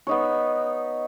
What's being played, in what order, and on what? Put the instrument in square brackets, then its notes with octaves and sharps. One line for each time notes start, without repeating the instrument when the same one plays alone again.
[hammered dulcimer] B3 D#4 C#5